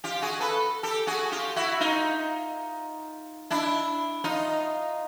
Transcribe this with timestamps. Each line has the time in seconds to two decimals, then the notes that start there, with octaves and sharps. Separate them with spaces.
0.04 F4 G4
0.22 F#4 G#4
0.40 A4 B4
0.83 G4 A4
1.07 F#4 G#4
1.32 F4 G4
1.56 E4 F#4
1.80 D#4 F4
3.51 D4 E4
4.24 D#4 F4